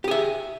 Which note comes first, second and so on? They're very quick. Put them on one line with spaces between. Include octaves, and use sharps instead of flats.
G4 G#4 E5